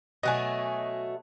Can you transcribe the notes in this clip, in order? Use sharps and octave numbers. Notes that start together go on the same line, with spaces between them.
B2 F#3 A3 D#5 G#5